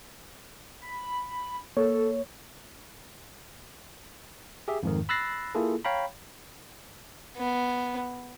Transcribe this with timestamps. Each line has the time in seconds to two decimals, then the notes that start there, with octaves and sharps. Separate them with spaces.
0.82 B5
1.77 A#3 A4 C#5
4.68 G4 G#4 E5
4.83 F2 G#2 D#3
5.09 B5 E6 F#6 A6 A#6 C7
5.55 A#3 E4 F4 G#4 A4
5.85 C#5 F5 G5 A#5 B5
7.37 B3